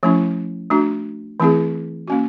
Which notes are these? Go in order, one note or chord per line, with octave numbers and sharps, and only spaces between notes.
F3 A3 C#4 E4
A3 D4 F#4
E3 A3 C4 E4 G#4
A#3 C#4 F#4